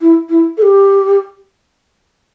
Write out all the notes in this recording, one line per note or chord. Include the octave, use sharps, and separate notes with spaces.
E4
E4
A4
G4